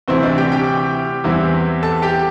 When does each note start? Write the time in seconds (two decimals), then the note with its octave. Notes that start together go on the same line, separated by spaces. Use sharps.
0.08 D2 C3 E3 C4 E4 C5
0.23 D4 D5
0.37 G4 G5
0.52 G4 G5
1.24 E2 E3 G3 C4 E4
1.83 A4 A5
2.02 G4 G5